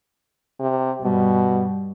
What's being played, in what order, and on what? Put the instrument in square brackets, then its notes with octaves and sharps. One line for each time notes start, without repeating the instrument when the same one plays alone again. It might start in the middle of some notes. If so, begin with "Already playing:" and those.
[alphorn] C3
[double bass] G2 G3 [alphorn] B2